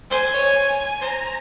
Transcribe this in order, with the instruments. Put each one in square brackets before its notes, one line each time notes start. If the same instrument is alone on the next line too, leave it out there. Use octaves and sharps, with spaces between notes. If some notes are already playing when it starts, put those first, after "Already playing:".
[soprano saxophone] C5 [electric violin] G#5
[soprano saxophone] C#5
[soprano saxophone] C5 [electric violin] A#5